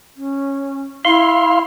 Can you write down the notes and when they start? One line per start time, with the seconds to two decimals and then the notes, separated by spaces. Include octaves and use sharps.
0.16 C#4
1.05 E4 F5 C6